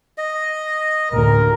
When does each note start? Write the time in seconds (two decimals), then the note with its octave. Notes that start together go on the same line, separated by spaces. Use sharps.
0.18 D#5
1.12 A1 D2 A2 A#4